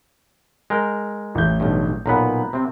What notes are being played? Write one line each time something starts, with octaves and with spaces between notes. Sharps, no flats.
G#3 A#4 G5
A1 G6
B1 G2
B1 A#2 B3 A#5 B5
C3 C4